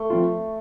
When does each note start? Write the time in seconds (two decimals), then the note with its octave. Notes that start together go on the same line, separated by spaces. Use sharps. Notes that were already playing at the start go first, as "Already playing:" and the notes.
Already playing: A3
0.10 F3 C4 F4